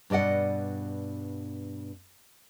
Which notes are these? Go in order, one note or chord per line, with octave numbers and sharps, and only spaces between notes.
G2 B2 D5 D#5 F#5